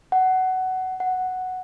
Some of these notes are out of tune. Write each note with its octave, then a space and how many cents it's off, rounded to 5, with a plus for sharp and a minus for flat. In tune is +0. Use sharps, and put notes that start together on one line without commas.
F#5 +15
F#5 +0